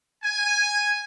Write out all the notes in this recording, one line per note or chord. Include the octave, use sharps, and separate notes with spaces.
G#5